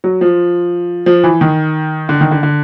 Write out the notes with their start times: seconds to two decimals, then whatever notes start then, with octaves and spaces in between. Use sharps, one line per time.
0.04 F#3
0.21 F3
1.06 F3
1.24 E3
1.41 D#3
2.09 D3
2.21 D#3
2.31 D3
2.43 D3